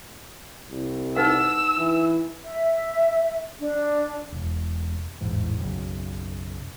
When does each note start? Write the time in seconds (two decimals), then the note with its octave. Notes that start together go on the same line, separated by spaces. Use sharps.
0.71 C2
1.16 D#4 B4 F#5 E6
1.78 E3
2.43 E5
3.59 D4
4.32 E1
5.21 A1 E2 G#2
5.60 B1 F#2 C#3